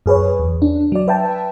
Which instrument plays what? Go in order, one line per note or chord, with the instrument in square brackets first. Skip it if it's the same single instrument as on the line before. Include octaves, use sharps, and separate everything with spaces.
[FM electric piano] F#2 G#4 B4 C#5
E2
D4
F#3 D5
B4 E5 G5 A5